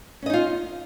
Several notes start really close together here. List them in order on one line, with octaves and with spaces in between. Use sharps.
C#4 D#5 D#4 F4